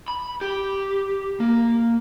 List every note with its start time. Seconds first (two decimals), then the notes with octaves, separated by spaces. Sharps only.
0.08 B5
0.41 G4
1.40 A#3